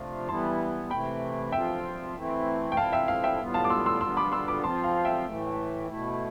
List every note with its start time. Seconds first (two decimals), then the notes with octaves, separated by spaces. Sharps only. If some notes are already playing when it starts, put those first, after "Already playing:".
Already playing: C3 F3 A3 D4 F4
0.28 E3 G3 B3 E4 A5 C6
0.90 C3 E3 A3 E4 G5 B5
1.52 F3 C4 F4 E5 G5
2.15 E3 A3 C4 E4
2.72 G5
2.77 F3 C4 E4 F5 A5
2.92 E5 G5
3.08 F5
3.23 E5 G5
3.40 A2 G3 B3 F4
3.54 F5 A5
3.64 D6
3.70 C6 E6
3.86 C6 E6
4.01 D3 G3 B3 F4 C6 E6
4.17 B5 D6
4.32 C6 E6
4.48 B5 D6
4.64 F3 C4 F4 A5 C6
4.84 F5
5.05 E5 G5
5.25 A2 E3 A3
5.88 B2 A3 E4